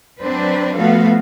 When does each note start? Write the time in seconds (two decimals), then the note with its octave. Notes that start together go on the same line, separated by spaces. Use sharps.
0.21 F#3 C4 D4 B4 C5
0.77 F3 A3 B3 F#4 A4 F5